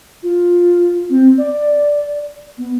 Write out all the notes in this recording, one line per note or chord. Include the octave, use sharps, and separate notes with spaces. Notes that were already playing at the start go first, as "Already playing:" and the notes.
F4
C4
D5
B3